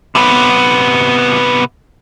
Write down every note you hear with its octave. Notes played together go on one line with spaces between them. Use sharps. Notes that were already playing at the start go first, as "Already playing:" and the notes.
C3 B3